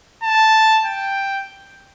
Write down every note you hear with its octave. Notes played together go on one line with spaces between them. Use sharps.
A5
G5